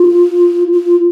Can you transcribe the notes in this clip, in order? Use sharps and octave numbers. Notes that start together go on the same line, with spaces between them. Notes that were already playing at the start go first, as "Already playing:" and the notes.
Already playing: F4
F4